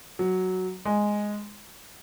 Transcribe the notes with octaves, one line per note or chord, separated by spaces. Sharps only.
F#3
G#3